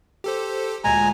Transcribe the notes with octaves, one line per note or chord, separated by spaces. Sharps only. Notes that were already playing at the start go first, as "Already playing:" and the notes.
G4 A4 C5
D2 A#2 G#3 G#5 A#5